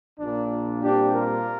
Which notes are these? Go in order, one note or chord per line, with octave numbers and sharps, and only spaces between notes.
A#1 A#2 A#3 D4
A#2 G3 C4 D4 G4
F4 A#4